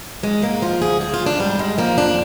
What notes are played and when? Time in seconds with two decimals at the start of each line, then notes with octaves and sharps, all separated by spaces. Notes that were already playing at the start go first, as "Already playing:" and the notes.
0.23 G#2 G#3
0.42 G#2 A#3
0.62 F3 F4
0.81 D2 G#4
1.01 F3 G#4
1.14 F4
1.20 D2
1.26 D4
1.39 G#2 G3
1.59 G#2 G#3
1.78 F3 A#3
1.97 F2 D4